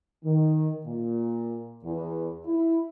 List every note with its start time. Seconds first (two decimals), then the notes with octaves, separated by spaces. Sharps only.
0.24 D#3
0.86 A#2
1.84 E2
2.46 E4